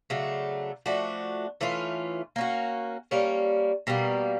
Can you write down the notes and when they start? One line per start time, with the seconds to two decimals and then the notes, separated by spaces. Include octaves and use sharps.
0.10 C#3 F#3 A3 D4
0.86 F3 A3 D4 F#4
1.61 E3 A3 C#4 F4
2.36 A#3 C#4 F#4
3.11 G3 A#3 C#4
3.87 B2 G3 A#3